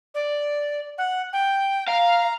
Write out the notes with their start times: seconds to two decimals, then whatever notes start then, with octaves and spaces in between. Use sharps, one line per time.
0.14 D5
0.98 F#5
1.33 G5
1.88 F5 A#5